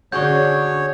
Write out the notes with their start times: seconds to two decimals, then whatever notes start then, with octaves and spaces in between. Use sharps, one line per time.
0.12 D3 C#4 F#4 G#4 C#5 D5 C#6 G6